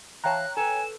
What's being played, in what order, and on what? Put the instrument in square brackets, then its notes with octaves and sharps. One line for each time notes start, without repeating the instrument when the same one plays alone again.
[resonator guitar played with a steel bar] E3 F5 A5 [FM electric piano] C#5 G5 A#5 [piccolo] F#6
[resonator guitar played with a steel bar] A4 B4 [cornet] G#5 [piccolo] E7